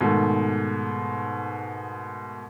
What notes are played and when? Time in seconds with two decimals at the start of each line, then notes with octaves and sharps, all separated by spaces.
0.01 G#2 B2 D#3 A3